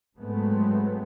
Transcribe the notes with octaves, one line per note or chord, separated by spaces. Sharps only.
G#2 F#3 G#3 A3 B3 C4